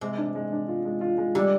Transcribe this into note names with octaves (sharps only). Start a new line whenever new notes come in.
C3 G#3
D4
G#3
D4
F4
G#3
F4
G#3
D3 G3